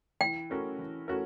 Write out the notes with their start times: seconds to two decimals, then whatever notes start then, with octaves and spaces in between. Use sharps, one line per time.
0.21 E3 G5
0.50 A3 C#4 F#4 A#4
0.79 E3
1.08 A3 C#4 F#4 A#4